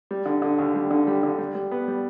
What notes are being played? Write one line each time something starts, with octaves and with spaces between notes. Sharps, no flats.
G3
D3
D3
D#2
G3
D3
G3
D3
G3
G3
B3
G3